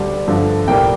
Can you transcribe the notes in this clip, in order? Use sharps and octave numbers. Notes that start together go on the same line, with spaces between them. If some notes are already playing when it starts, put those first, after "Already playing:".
Already playing: D2 D3 G3 D4
G2 D3 F3 A3
C2 A#2 G3 A#3 G5